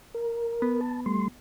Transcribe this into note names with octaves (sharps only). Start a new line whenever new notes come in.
A#4
B3
A5
G3 A3 C6